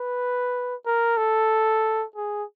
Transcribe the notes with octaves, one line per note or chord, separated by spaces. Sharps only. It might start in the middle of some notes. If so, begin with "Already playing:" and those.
Already playing: B4
A#4
A4
G#4